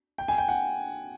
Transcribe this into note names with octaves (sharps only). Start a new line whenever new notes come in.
G5
G#5
G5
F#5